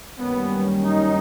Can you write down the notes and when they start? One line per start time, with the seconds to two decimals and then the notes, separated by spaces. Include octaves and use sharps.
0.19 F#2 D#3 G3 A#3 B3 C#4
0.84 D#4